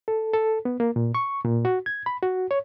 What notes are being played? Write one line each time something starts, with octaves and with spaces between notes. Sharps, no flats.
A4
A4
B3
A#3
A#2
C#6
A#2
F#4
G#6
B5
F#4
C#5